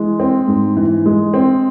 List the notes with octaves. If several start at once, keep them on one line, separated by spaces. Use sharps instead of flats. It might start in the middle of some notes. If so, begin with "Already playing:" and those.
Already playing: E3 G#3
C4
G#2
E3
G#3
C4